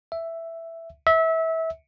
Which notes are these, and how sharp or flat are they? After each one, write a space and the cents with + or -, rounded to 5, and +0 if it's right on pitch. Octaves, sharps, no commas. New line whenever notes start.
E5 +5
E5 -25